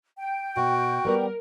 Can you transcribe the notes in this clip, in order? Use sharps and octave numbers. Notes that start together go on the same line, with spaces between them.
G5
B2 F#4
G3 B3 A#4 D5